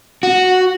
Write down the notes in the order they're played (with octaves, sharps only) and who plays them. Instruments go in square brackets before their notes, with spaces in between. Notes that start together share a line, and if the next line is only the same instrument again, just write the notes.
[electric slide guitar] F#4